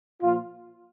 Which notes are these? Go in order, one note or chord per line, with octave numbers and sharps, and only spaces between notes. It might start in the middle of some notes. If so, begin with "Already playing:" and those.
A#2 F3 F4